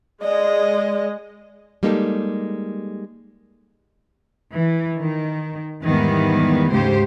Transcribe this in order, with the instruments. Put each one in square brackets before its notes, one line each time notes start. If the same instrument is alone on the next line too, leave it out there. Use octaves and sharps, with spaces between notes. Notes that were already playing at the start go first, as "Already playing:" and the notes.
[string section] G#3 [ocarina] D5 [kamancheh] D#5
[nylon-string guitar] G3 G#3 A#3 D#4 G4 A4
[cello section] E3
D#3
E2 G#2 D#3 E3 G3 B3
D2 G#2 C#3 G4 C5